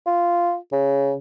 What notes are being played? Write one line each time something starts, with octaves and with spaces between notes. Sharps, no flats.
F4
C#3